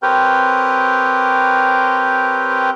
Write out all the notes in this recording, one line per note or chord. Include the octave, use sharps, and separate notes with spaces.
C4 G4 A#4 B4 C#5 G5